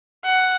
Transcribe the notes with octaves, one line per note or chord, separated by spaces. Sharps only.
F#5